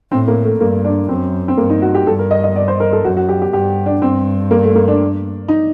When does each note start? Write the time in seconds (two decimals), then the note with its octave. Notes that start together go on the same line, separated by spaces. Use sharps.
0.11 A2 C4
0.28 A#3
0.44 A3
0.60 G2 A#3
0.85 D4
1.09 F#2 C4
1.48 C4
1.57 G2 A#3
1.70 D#4
1.82 F#4
1.94 G4
2.06 G2 A4
2.19 A#4
2.31 D#5
2.44 D#5
2.56 D5
2.68 C5
2.80 A#4
2.93 A4
3.04 F#2 F#4
3.17 F#4
3.29 G4
3.42 G4
3.53 G2 G4
3.86 D4
4.02 G2 C4
4.51 A#3
4.63 A3
4.75 A#3
4.88 D4
5.48 D#4